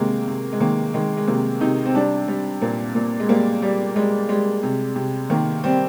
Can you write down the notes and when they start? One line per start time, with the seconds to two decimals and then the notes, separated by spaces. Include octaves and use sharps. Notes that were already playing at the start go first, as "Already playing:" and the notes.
Already playing: C3 D#3 G#3 A#3
0.27 C3
0.53 G#3
0.60 D#3 A#3
0.94 D#3 G#3
1.17 G#3
1.27 C3 A#3
1.61 C3 D#4
1.85 C4
1.94 G3 D4
2.28 G3
2.62 A#2 A#3
2.95 A#2
3.20 G#3
3.28 G3 A#3
3.62 G3
3.96 G3 G#3
4.29 G3 G#3
4.63 C3
4.95 C3
5.30 D#3 A#3
5.64 G3 C4